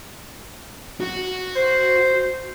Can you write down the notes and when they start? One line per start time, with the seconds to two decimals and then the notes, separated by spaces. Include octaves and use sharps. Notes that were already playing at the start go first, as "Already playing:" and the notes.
1.00 F#4
1.56 C5